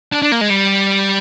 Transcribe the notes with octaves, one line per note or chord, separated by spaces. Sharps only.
D4
D4
A#3
G#3
G3